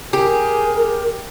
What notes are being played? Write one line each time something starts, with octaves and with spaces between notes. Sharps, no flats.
G4 G#4 A#4